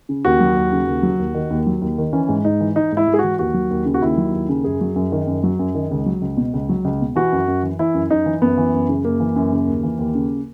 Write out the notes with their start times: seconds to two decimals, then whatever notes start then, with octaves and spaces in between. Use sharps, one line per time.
0.09 C#3
0.25 D#2 F#4
0.40 F#3
0.56 D#2
0.72 C#3
0.87 D#2
1.03 F#3
1.19 D#2
1.35 D#3
1.50 D#2
1.67 F#3
1.82 D#2
1.98 D#3
2.13 E3 C#4
2.29 G#2
2.45 G#2 D#4
2.60 E3
2.76 E3 D#4
2.92 G#2 E4
3.07 G#2
3.14 G#4
3.19 E3 F#4
3.39 D#2 F#4
3.54 F#3
3.71 D#2
3.86 C#3
3.94 F#4
4.02 D#2 E4
4.18 F#3
4.34 D#2
4.49 C#3
4.64 F#2 G#4
4.81 F#3
4.96 F#2
5.12 D#3
5.27 F#2
5.44 F#3
5.59 F#2
5.75 D#3
5.91 C#2
6.06 F#3
6.21 C#2
6.37 B2
6.53 C#2
6.69 F#3
6.84 C#2
7.01 B2
7.16 E3 F#4
7.32 F#2
7.48 F#2
7.63 E3
7.79 E3 E4
7.94 F#2
8.10 F#2 D#4
8.26 E3
8.42 F#2 B3
8.58 E3
8.74 F#2
8.89 C#3
9.04 F#2 A#3
9.20 E3
9.36 F#2
9.52 C#3
9.67 D#2
9.83 E3
9.99 D#2
10.15 C#3